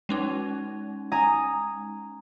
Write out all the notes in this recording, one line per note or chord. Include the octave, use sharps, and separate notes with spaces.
G#3 C#4 D#4
G#5 A#5 D#6